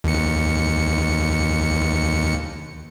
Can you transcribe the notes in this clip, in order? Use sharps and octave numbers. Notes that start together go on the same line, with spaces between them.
D#2 C#7